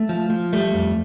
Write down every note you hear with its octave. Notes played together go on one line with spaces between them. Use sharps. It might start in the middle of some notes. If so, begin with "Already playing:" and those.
Already playing: A3
F3
F3
G3 A3
F2